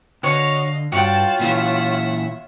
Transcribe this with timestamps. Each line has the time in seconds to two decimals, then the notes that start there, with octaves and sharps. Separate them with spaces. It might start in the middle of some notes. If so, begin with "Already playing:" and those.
0.23 D3 F#4 C#5 D#5 F5
0.92 G2 F4 F#4 C#5 G5 A5 F#6
1.39 A#2 D#3 E3 E5 F#5